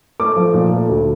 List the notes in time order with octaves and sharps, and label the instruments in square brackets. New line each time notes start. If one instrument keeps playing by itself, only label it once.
[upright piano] A3 D6
F3
A#2
A3
D2